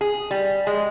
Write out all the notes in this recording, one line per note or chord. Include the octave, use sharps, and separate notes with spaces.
G#4
G3
G#3